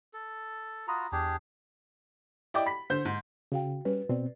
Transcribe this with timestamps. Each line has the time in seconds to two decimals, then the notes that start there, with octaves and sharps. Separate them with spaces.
0.14 A4
0.88 F4 F#4 A#5 B5 D#6
1.12 E2 D4 G4 G#4
2.54 E4 D5 D#5 G5 D6
2.66 B5 B6
2.90 D3 C5 G6
3.05 G#2
3.52 C#3 F#4 F5 G5
3.85 G3 C#4 B4
4.09 B2 C4 D5